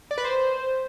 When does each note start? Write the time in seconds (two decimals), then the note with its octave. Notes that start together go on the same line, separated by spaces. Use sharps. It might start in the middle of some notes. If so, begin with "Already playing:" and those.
0.11 D5
0.18 B4
0.24 C5